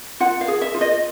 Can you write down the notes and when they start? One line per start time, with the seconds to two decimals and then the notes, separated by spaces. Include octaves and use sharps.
0.20 F4 F#5
0.41 F5
0.48 G#4
0.61 E5
0.74 F4
0.81 D#5